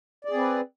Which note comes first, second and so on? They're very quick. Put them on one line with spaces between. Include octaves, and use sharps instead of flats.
D5 G#4 C4 B4